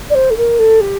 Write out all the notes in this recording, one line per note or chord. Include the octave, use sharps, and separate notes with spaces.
D5
C5
A4
A#4
A4
G4